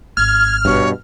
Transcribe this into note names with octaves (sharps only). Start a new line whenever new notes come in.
G#1 F6 G#6
G2 B2 C#5